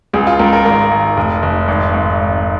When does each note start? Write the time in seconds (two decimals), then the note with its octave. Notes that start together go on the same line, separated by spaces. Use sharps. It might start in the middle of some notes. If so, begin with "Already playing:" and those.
0.13 C#2 G#4
0.27 F4
0.39 C#2 A#4
0.53 A#4
0.65 G#1 A#4
0.91 G#1
1.17 F1
1.42 F1
1.68 G#1
1.93 G#1